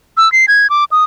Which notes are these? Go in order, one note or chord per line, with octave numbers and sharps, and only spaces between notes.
E6
C7
G#6
D6
D#6